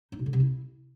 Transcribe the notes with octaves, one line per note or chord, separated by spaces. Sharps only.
D#4
B2
D3
C3
E4